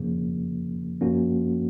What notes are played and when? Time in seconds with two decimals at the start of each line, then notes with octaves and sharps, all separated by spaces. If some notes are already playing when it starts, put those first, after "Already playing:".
Already playing: F2 C#3 F3 A#3
1.01 F#2 F3 A#3 C#4 F#4